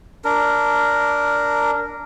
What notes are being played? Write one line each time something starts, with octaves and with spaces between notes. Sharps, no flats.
D4 A#4